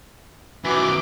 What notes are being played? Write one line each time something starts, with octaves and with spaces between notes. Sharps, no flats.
F#2 D#3 E3 F#4 D6